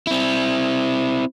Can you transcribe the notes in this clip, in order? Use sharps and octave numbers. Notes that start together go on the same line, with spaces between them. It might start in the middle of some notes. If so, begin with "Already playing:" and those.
C4 E4